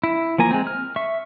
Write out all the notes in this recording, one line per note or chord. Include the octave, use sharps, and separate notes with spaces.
E4
F3 A#3 G#5 A#5
G#3 C4
F6
E5 C#6